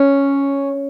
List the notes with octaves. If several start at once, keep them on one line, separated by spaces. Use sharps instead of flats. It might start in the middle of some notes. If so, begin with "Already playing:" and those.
Already playing: C#4